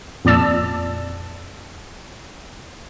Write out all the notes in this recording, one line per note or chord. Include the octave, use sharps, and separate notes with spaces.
F2 A#2 D5 A5 E6